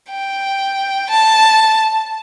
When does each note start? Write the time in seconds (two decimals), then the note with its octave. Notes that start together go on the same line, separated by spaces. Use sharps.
0.10 G5
1.10 A5